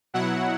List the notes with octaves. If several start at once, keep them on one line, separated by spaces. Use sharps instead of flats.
B2 F#3 E4 F#5